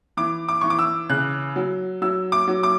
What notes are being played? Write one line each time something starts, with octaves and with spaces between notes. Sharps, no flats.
E3 D6
D6
E3 C#6
D6
E6
C#3 F#6
F#3
F#3 E6
D6
F#3
D6